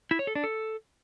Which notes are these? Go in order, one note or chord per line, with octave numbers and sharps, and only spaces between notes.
E4
C#5
A4
D4
A4